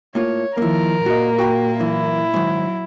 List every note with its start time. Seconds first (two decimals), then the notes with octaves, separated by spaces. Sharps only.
0.15 A2 A#3 F4 C#5
0.58 D#3 F3 A#3 E4 A#4
1.06 A#2 A#3 F#4 D#5
1.38 F#4 G5 B5
1.80 F#2 E3 E4
2.34 G#2 D#3 F#3